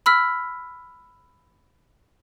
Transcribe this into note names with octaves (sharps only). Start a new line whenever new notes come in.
B5 E6 F6 B6